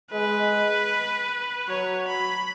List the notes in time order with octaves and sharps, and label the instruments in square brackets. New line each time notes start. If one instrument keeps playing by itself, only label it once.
[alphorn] G#3 [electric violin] B4
[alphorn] F#3 [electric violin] C#5
[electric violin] B5